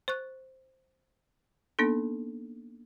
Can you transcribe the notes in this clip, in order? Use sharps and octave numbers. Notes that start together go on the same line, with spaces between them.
C5 C#6 F#6
A#3 B3 D4 D#4 A4